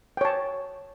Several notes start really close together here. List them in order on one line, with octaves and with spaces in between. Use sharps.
G5 C#5 A5